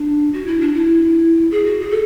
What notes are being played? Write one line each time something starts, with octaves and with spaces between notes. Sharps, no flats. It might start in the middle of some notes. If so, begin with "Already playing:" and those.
Already playing: D4
F#4
E4
D4
E4
G#4
F#4
G#4
A4